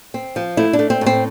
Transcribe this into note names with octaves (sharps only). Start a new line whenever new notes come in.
C4
F3
A3 E4
D4
A3
C4
A2
C4